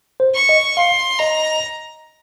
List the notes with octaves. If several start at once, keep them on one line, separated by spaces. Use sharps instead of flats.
C5
C#6
D#5
F5 C6
D#5 A#5